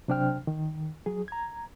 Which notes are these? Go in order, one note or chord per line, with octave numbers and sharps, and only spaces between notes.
C3 F#3 D4 C5 G5 F6
D#3
F#3 G#4
A#5 G#6